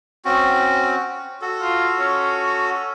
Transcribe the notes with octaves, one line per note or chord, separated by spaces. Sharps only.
C4 C#4 F#4
F#4 A4
F4
C#4